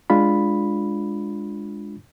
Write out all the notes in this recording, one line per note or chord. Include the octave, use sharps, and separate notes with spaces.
G#3 D4 F4 B5